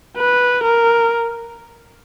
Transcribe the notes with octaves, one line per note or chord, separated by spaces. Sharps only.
B4
A#4